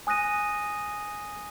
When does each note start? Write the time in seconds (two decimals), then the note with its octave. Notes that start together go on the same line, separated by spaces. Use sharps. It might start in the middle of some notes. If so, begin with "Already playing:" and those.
0.07 G#5 D#6 F#6 A#6 D#7